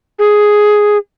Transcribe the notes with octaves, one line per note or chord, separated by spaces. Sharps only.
G#4